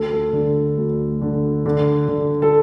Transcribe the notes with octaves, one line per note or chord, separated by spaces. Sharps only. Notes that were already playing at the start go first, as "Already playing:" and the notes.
Already playing: D2 A4
A4
D3
D2
D3
D3
D3
A4